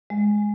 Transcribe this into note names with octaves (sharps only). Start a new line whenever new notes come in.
G#3